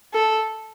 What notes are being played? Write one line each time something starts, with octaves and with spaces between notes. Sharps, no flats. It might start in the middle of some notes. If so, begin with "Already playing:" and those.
A4